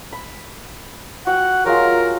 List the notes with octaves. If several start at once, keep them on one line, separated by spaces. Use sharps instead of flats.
B5
F#4 F#5 G5 E6
F#3 G#3 F4 A#4